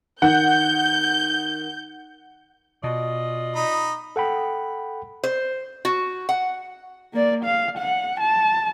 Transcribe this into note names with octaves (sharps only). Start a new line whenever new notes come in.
D#3 F#5 G6
B2 F4 D5 D#5
D#4 B5 D#6
A4 F#5 G5 B5
C5
F#4
F#5
A#3 D5
F5
F#5
A5